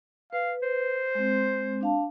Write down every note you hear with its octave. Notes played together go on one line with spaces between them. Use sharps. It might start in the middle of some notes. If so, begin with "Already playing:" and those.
B4 F5
C5
G#3 C4
D4 F5 A5